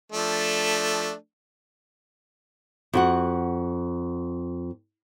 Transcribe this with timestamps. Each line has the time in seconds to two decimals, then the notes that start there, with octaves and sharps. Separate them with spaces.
0.12 F3 A3 D4
2.93 F2 F#4 F#5